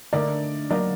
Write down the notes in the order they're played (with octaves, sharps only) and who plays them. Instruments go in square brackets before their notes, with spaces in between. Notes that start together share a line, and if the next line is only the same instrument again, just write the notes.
[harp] D3 A3 D#4 [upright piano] A#4 D5
[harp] F#3 A#3 D#4 [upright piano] A#4 D5